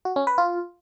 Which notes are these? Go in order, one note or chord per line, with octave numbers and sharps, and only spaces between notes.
F#4
C#4
B4
F4